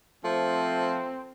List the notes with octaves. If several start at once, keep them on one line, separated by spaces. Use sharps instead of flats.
F3 A3 C4